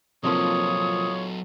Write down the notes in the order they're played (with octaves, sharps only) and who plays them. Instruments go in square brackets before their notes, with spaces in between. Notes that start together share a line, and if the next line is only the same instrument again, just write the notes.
[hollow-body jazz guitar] C3 F3 A#3 [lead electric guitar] F#3 A4 [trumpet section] F4 C#5 [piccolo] D#6